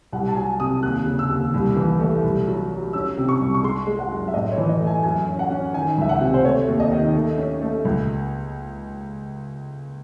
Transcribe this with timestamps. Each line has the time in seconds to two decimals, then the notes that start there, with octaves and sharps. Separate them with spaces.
0.13 C2 F#5
0.28 A5
0.36 F#3 G#5
0.60 C3 D#6
0.83 D#2 F#6
1.06 C#3
1.19 E6
1.30 D#2
1.54 C2
1.76 E3
2.00 A3
2.24 C2
2.47 F#3
2.70 F#3
2.93 C#4 E6
3.17 C3
3.29 C#6
3.40 C2
3.54 C#6
3.63 G#3 C6
3.87 G#3
3.99 F#5
4.11 F#2
4.28 E5
4.34 A2 D#5
4.52 C#5
4.57 E3
4.69 D#5
4.80 A3
4.87 G#5
5.04 F#2 G#5
5.28 C#4
5.39 F#5
5.51 C#4
5.74 D#3 G#5
5.98 C#2 E5
6.09 F#5
6.21 C3
6.34 C5
6.45 A3 C#5
6.68 D#2
6.80 D#5
6.91 D#3
7.15 A3
7.38 C#4
7.62 A3
7.85 C#2